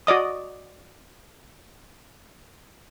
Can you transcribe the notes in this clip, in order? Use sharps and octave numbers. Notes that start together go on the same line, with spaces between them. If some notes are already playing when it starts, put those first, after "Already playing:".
F#4 D5 D#5 D#6